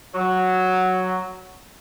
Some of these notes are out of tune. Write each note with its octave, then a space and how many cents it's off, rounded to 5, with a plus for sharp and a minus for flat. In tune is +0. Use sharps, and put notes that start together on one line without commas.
F#3 +0